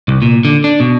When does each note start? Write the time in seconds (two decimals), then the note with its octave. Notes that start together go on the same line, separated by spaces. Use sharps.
0.08 C2
0.22 A#2
0.45 D3
0.64 D4
0.80 B2